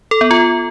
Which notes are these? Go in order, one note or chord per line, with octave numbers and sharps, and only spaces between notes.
A4
B3
F4